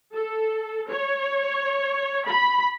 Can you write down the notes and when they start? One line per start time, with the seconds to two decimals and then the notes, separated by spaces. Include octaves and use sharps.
0.15 A4
0.90 C#5
2.27 B5